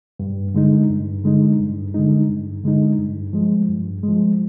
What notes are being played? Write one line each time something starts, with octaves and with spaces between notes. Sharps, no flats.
G2
D3 G#3 D#4
G2
D3 G#3 D#4
G2
D3 G#3 D#4
G2
D3 G#3 D#4
G2
F3 G#3
G2
F3 G#3